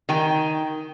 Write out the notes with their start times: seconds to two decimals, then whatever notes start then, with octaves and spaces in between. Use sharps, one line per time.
0.09 D#3 G5 G#5